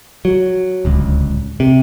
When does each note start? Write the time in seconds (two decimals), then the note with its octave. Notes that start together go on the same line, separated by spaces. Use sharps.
0.25 F#3
0.85 D1 C#2
1.60 C3